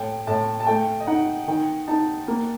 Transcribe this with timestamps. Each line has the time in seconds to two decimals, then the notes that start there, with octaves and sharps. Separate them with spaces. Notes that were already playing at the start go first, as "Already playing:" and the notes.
Already playing: A2 G5
0.27 A2 A5
0.60 A5
0.67 A3 G5
1.00 D#5
1.07 D#4 F#5
1.48 D#3 G5
1.87 D#4 A5
2.28 A#3